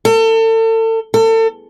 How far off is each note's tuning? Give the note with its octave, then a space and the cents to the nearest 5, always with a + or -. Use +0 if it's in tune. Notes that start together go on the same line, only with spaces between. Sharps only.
A4 +35
A4 +35